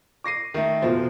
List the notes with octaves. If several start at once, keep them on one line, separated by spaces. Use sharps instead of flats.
D6 A#6 C7 D#7
D#3 A3
F1 B2 F3 C5